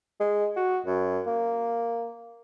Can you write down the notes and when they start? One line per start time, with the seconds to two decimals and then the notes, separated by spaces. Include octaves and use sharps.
0.20 G#3
0.56 F#4
0.86 F#2
1.27 A#3